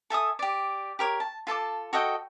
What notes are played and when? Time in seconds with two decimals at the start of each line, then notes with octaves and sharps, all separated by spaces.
0.10 A4 E5 G#5 D#6
0.39 G4 D5
0.99 G4 A#4 C#5
1.20 A5
1.47 F4 A4 A5 D6
1.93 F#4 A4 D#5 G5